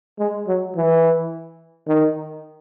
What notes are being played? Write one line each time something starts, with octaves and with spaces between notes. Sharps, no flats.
G#3
F#3
E3
D#3